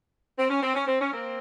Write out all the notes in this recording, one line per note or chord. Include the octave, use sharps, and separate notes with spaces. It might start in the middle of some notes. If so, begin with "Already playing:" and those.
C4
C#4
C4
C#4
C4
C#4
A#3 C4